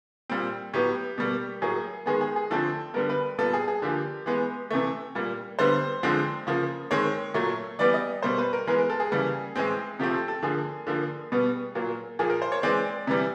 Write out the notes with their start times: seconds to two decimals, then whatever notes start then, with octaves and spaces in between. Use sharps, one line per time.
0.30 A#2 G3 C4
0.74 A2 F#3 B3 G4
1.18 B2 G3 A#3
1.62 A2 F#3 A#3 G#4
2.06 D#3 G#3 B3 G#4
2.21 G#4
2.36 G#4
2.51 D3 F3 A3 C4 A4
2.94 D3 G3 B3 A#4
3.09 B4
3.38 A#2 G3 B3 A4
3.53 G#4
3.68 G#4
3.82 D3 F3 A#3 G4
4.26 E3 G#3 B3
4.71 C3 E3 A3
5.15 A#2 G3 A#3
5.59 D3 G3 B3 C5
6.03 D3 F3 G#3 C4
6.47 C#3 F3 A#3
6.91 D#3 G#3 C4 C#5
7.34 A#2 F#3 A3
7.79 E3 G3 B3 D5
7.94 D#5
8.23 B2 G3 A#3 C5
8.38 B4
8.53 A#4
8.67 E3 G#3 B3 A#4
8.79 A#4
8.90 A4
9.00 G#4
9.11 C#3 E3 G3 A#3
9.56 A2 E3 G#3 C4
9.99 C3 F3 A3 C4 G4
10.14 A4
10.28 A4
10.43 D3 F3 A#3 G#4
10.87 D3 F3 A#3
11.32 B2 G3 B3
11.75 A#2 F#3 A#3
12.19 A#2 F3 A#3 G#4
12.30 A#4
12.42 C5
12.52 C#5
12.63 E3 G#3 C4 D5
13.07 C3 E3 G3